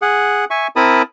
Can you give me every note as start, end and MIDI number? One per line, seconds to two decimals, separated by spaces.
0.02 0.45 68
0.02 0.45 78
0.50 0.67 76
0.50 0.67 80
0.50 0.67 85
0.76 1.02 60
0.76 1.02 64
0.76 1.02 70
0.76 1.02 81
0.76 1.02 83
0.76 1.02 87